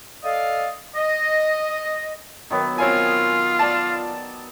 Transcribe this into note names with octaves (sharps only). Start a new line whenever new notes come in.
A4 D5 D#5 F5
D#5
D#3 F#3 B3
C4 F4 C#5 G#5
D5 A5